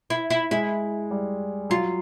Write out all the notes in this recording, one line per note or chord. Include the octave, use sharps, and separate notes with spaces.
E4
E4
G#3 E4
G3
F#3 F4